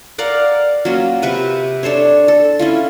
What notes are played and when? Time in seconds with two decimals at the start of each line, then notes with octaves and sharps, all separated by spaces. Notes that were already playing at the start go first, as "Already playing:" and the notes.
0.18 A#4 D5 F5 F#5
0.85 F#3 A#3 C#4 F4
1.22 C3 B4 C#6
1.83 D4 A4 C5 C#5
2.28 A4
2.59 C#4 E4 F4